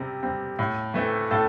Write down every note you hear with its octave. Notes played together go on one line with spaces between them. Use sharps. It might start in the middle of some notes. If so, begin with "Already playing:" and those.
Already playing: C3 G3 C4
G3 C4
A2
E3 A3 C4
A2 A4